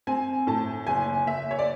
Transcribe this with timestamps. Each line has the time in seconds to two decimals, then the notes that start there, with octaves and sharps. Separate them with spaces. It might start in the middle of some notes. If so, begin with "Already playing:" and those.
0.07 C4 G#5
0.47 A2 A5
0.87 F#1 G#5
1.27 F#1 E5
1.51 C#5
1.59 D5